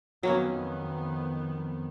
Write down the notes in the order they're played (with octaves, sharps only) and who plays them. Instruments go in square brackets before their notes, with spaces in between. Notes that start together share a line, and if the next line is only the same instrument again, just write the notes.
[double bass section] F2 D#3 B3 [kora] F#3 A#3 C#4